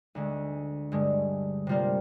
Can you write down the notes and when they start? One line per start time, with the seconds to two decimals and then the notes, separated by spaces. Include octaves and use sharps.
0.15 D2 D3 G#3
0.92 G2 D3 G#3
1.67 C3 G3 A#3 F4